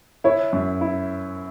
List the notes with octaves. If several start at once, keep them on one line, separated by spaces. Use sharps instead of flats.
E4 C#5
F#2
E4